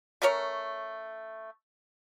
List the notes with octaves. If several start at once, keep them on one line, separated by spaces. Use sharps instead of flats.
A3 C#4 A#4 C#5